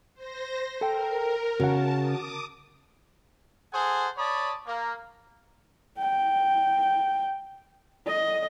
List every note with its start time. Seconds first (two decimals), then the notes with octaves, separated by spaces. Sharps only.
0.14 C5 A#6
0.81 A4 A#4 G5
1.60 C#3 F#4 F#5 A5
1.99 D6 D#6
3.72 G#4 A4 C5 F#5 G#5
4.17 C#5 D5 A5 B5 D#6
4.66 A#3
5.99 G5
8.07 D#5